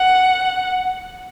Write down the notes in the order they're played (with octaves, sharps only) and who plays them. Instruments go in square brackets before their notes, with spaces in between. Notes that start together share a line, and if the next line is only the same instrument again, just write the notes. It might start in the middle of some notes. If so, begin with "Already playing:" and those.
Already playing: [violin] F#5